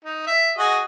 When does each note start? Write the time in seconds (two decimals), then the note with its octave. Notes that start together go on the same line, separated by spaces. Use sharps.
0.05 D#4
0.27 E5
0.58 F#4 G#4 D#5